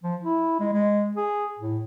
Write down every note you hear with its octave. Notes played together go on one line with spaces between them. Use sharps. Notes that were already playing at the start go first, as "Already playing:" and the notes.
F3
E4
G#3
G#3
G#4
A2